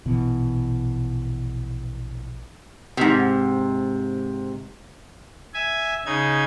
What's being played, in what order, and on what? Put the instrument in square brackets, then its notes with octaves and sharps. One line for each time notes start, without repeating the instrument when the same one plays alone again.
[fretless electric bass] A#1 B2 E3
[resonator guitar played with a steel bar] G#2 C3
[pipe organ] E5 G#5
C#3 D#4 G#6